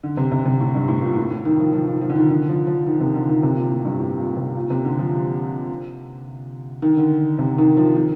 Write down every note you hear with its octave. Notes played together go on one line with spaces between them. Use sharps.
D3
C3
C3
C3
A2
G2
A2
A#2
A2
A2
D#3
F3
F3
D#3
F3
D3
D#3
D3
F3
F3
D#3
C3
D3
D#3
C3
A#2
A2
G2
A2
A#2
C3
A#2
C3
D3
F3
D#3
D3
C3
D#3
F3
D#3